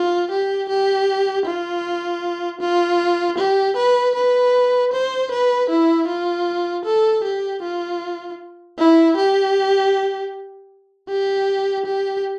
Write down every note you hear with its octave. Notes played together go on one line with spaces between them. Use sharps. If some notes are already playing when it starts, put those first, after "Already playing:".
Already playing: F4
G4
G4
F4
F4
G4
B4
B4
C5
B4
E4
F4
A4
G4
F4
E4
G4
G4
G4